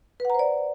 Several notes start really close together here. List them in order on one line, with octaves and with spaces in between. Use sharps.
B4 F#5 A#5 C5 D5